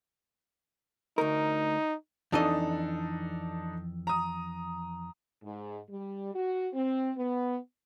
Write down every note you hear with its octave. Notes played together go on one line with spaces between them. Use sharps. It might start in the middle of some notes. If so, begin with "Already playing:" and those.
D2 D#4 A#4
F2 E3 D4 D#4 A4 D#5
A#5 D#6
G#2
G3
F#4
C4
B3